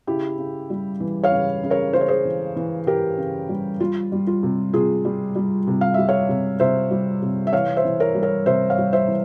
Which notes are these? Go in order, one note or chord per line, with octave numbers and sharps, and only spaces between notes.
C#3 E4 G4
C#3
G3
E3
C#5 F5
C#3
C#3
A#4 C#5
C#3 C5
C#5
G#4 C5
E3
E3
E3 G4 A#4
C#3
G3
G3 F4
G3
F4
C3
C3 F4 G#4
G3
G3
C3
F5
G3 E5
C#5 F5
C3
C3 C5 E5
G3
C3
E5
E3 C#5 F5
C5 E5
E3
A#4 C#5
G3
A#4 C#5
C3 C5 E5
C#5 F5
G3
C5 E5
E3